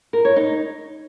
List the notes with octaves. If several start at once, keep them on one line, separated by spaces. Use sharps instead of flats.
A#4
C#5
D#4